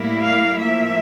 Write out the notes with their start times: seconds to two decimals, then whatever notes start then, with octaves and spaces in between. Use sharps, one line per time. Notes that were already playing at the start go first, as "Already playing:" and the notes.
Already playing: A2 G3 A#3 E4
0.23 F5
0.56 A2 F3 A#3 E5